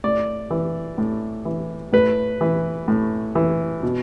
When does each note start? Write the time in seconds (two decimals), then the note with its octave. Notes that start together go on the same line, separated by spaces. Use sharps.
0.04 A2 D5
0.51 E3
0.98 A2
1.45 E3
1.93 A2 B4
2.41 E3
2.88 A2
3.35 E3
3.83 B2